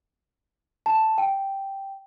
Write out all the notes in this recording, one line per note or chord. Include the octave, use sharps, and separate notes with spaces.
A5
G5